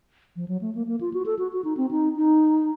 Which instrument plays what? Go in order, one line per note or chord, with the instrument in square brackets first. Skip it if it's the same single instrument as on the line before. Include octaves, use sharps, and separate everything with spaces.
[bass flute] F3
F#3
A3
A#3
A#3
F4
F#4
A4
F#4
F#4
D#4
C4
D#4
D#4